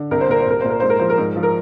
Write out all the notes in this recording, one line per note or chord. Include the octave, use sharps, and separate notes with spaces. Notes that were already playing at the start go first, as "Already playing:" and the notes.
Already playing: D3
C2 A#4
C5
A#2 A#4
C5
C2 A#4
A#2 C5
A#4
G#2 C5
A#4
F3 C5
A#4
G#2
F3
A#4